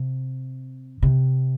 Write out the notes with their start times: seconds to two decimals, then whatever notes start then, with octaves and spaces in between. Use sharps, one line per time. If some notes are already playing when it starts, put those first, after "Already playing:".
Already playing: C3
1.02 C3